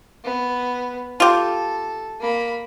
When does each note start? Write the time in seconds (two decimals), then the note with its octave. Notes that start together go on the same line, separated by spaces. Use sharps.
0.24 B3
1.20 F4 G4 A4
2.20 A#3 B5